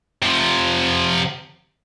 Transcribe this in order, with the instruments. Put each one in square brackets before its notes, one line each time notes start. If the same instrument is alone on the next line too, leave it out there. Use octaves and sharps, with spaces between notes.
[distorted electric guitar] C3 F3